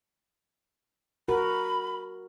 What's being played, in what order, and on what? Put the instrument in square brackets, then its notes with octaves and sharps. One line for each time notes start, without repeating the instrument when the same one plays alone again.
[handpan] F#4 A#4 [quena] B5